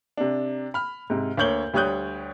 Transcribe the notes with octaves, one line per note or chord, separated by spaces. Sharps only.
C3 D4
B5 F6
G#2 C3
D2 A#3 C#5 G6 F#7 G7
D2 G3 C#5 D#6 F#6 G6